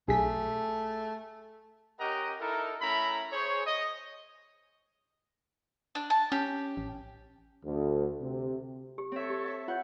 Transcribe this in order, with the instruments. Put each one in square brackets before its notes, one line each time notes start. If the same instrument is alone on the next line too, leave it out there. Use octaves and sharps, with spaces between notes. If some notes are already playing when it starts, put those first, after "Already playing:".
[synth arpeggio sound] B1 B6 [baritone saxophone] A3 [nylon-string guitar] G#4
[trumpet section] C#4 G4 A#4 D#5 F#5 A#5
D#4 E4 A4 A#4
A3 C#4 E4 A#5 B5
G#4 C5 C#5
D#5
[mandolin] D4
A5
[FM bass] C#4 [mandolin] G4
[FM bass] A1
[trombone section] D2
C3
[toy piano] G4
[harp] C4 E5 [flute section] A4 C#5
[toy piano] G4
[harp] E5
[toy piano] F4 C#5 [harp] F#5